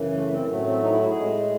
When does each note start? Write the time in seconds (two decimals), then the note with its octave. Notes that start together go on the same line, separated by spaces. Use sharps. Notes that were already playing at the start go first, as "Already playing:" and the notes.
Already playing: F#2 C#3 E3
0.16 A3
0.33 C4
0.50 A2 F#3 A3
0.67 C4
0.84 D#4
0.93 E4
1.02 F#4
1.10 G#4
1.19 A2 G#3